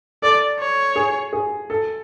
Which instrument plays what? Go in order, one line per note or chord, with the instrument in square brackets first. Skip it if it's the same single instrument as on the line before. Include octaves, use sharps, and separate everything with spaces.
[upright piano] A4 [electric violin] D5
[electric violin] C#5
[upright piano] G#4
G#4
A4